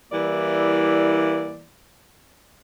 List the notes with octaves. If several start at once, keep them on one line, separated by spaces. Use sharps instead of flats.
E3 G3 A#3 E4 D5